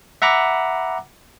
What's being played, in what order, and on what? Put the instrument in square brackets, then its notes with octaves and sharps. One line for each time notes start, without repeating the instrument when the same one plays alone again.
[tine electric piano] E5 F#5 A#5 B5 D6